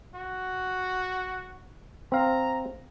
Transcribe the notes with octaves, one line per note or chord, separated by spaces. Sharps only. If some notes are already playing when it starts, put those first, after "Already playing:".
F#4
C4 F5 A#5